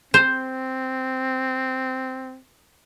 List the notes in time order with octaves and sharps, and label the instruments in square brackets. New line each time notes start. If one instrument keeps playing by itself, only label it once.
[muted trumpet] C4 [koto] C5